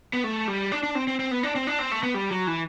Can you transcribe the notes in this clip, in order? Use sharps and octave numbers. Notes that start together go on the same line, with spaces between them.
B3
A3
G3
D4
D4
C4
C4
C4
B3
D4
C4
D4
C4
A3
B3
G3
F#3
E3